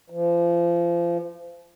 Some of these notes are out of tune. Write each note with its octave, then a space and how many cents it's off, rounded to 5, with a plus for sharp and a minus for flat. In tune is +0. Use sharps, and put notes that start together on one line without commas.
F3 -30